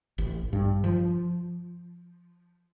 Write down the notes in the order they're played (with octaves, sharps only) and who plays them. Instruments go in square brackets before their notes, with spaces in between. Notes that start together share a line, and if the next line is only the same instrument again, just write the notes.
[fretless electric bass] A1
G2
F3